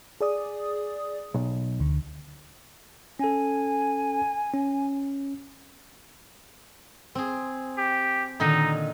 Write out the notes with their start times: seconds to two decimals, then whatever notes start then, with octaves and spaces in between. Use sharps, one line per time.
0.21 G#4 D5 D#6
1.34 B1
1.80 D2 D3
3.19 C#4 A4 G#5
4.54 C#4
7.15 C4 G#4
7.77 G4
8.40 A#2 D3 D#3 D#4